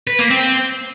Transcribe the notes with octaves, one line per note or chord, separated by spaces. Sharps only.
B4
A#3
C4